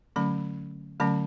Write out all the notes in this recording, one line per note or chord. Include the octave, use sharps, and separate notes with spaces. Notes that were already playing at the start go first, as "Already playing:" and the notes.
D3 F#3 A3 C#4 B5
D3 F#3 A3 C#4 A5